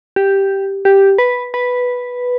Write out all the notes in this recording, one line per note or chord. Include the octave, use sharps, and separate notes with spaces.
G4
G4
B4
B4